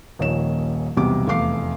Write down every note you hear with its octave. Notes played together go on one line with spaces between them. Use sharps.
D#1 A#1 D#3 C#5 E7
B1 E2 C3 G3 D6
F1 E2 A3 F5 D6 C7